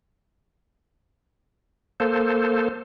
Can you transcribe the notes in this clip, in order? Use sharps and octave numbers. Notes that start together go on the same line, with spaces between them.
A#3 A4 C5